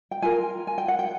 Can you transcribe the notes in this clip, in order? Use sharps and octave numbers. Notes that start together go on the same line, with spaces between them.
G5
F4 A#4 G#5
G#5
G5
F#5
G5